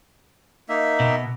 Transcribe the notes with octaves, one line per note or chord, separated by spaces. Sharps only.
A#3 D#4 E5
B2